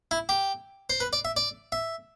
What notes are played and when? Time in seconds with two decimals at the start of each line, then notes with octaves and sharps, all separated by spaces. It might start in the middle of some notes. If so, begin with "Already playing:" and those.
0.11 E4
0.29 G4
0.90 C5
1.00 B4
1.13 D5
1.25 E5
1.37 D5
1.72 E5